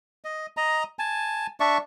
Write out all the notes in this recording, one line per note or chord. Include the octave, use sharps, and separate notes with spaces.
D#5
D#5 A#5
G#5 A5
D4 D5 E5 C#6